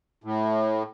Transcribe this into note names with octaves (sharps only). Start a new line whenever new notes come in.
A2